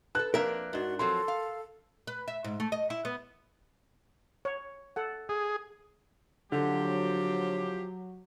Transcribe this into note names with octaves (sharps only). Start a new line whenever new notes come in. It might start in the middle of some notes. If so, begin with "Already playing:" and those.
A4 B4 A5 F#6
F2 A#3 D4 A#4 E5
G#2 D4 F#4
F3 F#3 C4 A4 C6
F5
B4
E5
G#2
A3
D#5
E4
B3
C#5
A4 F#5
G#4
D3 F3 F#3 C4 G4